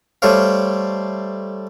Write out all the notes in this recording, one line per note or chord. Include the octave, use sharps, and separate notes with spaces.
G3 A3 C5 C#5 F5